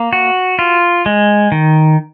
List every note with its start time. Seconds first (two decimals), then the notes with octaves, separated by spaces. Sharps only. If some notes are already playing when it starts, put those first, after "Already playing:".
Already playing: A#3
0.13 F#4
0.59 F4
1.06 G#3
1.52 D#3